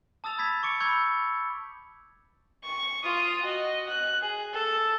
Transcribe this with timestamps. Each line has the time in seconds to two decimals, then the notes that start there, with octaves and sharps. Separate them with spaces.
0.24 A5 D#6 E6 A6 E7 F7
0.38 B5 G#6 A6 B6
0.63 C#6 D6 C#7 D7
0.80 B5 C#6 E6 G6 G#6 C#7
2.64 C#6
3.04 F4 D#6
3.42 F#4 D#5
3.89 F#6
4.22 G#4
4.53 A4